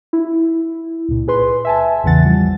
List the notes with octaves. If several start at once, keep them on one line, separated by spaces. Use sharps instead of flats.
E4
C#2 A#2
A#2 G#4 B4 C6
E5 G#5 A5
A1 E2 C#3 E3 F#5 A6
F3 G3